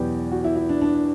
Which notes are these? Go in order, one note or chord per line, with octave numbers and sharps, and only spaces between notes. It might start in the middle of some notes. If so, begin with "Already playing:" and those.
Already playing: E2 B2 F#3 B3 G4 B4 D5
F#4
E4
E4
D4
D4